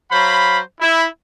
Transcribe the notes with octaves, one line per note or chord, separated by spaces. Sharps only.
F#3 C5 F5 B5
E4